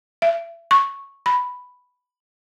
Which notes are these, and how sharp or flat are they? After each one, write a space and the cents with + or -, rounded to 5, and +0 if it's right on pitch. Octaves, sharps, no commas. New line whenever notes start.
E5 +35
C#6 -10
B5 +5